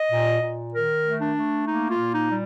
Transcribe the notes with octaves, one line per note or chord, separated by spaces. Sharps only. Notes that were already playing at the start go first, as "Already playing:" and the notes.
Already playing: D#5
A#2
A#2
D#3 A#4
A3
D4
A3
A#3 D#4
F4
A#2
D#4
G3